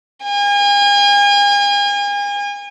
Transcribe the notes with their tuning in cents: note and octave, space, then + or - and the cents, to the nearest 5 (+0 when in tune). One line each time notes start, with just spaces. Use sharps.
G#5 -40